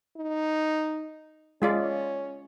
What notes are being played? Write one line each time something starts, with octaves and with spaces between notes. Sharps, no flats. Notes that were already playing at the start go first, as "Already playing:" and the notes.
D#4
G#3 C#4 F4 D5